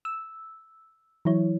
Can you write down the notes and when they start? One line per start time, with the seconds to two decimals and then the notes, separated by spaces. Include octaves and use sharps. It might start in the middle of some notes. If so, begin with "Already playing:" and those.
0.05 E6
1.25 E3 F#3 E4 C#5